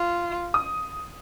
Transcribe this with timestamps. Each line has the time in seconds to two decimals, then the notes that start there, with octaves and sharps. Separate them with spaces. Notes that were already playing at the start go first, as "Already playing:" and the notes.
Already playing: F4
0.54 D#6